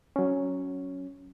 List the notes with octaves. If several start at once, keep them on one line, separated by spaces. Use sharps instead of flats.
F#3 C#4